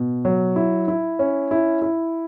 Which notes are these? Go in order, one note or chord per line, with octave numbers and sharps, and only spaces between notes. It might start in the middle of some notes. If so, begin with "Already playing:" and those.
Already playing: B2
F#3
E4
E4
C#4
E4
E4